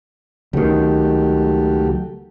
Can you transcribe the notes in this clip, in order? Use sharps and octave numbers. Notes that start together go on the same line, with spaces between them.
C#2 D#3 F#3 A3 G4